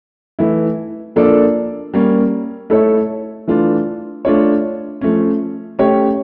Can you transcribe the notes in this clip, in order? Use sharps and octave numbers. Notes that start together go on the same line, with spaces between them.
E3 A3 E4
F3 A#3 D4 A4 D5
G3 A#3 C#4
A3 E4 A4 C#5
E3 A3 D4 F4
A3 D4 F4 C#5
F3 A3 C#4
A3 C#4 G4 C#5